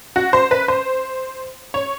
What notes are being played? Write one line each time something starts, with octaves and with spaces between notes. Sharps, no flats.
F#4
C5
B4
C5
C#5